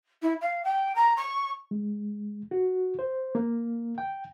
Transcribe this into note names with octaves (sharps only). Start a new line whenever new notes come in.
E4
F5
G5
A#5
C#6
G#3
F#4
C5
A#3
G5